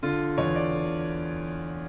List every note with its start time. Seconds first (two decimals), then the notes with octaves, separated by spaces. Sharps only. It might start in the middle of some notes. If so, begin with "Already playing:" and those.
0.03 D3 F4
0.38 E2 C#5
0.55 D5
0.73 D3